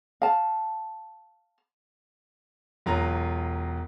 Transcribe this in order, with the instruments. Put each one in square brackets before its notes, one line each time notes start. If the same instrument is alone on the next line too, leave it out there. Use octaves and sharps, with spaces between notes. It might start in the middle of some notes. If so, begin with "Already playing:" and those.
[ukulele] F5 A5
[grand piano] E1 F#3 F4 A#5